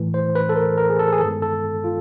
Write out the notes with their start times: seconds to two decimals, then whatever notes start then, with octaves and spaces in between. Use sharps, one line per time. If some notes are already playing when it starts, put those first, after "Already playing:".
Already playing: A2 E3 A3
0.14 C5
0.35 B4
0.49 A4
0.56 A#4
0.78 A#4
0.90 G#4
0.99 A4
1.12 G#4
1.21 G2 D#3 G#3 B3 A4
1.42 A4
1.84 F4